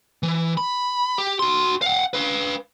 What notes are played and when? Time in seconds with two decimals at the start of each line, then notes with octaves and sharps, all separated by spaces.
0.23 E3
0.57 B5
1.18 G4
1.39 F#4 C6
1.82 F5 F#5
2.13 B4 F5